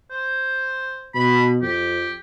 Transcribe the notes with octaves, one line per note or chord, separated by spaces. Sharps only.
C5
B2 B5
F2 G4